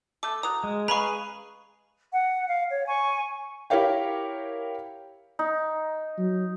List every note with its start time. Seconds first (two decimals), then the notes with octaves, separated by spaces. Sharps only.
0.23 A3 A4 D6
0.43 F#3 A#5 D#6
0.64 G#3
0.88 C#4 G#4 B4 D#5 F5 A#5 B5 C#6
2.13 F#5
2.48 F5
2.70 C#5
2.88 G#5 C#6
3.70 E4 G4 A#4 C#5 F5 G5
5.39 D#4
6.18 F#3